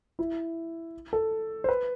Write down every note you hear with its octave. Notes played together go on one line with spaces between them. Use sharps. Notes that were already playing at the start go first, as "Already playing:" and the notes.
E4
A4
C5
B4